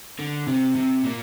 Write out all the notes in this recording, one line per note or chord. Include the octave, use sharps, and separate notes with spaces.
D3
C3
C3
A#2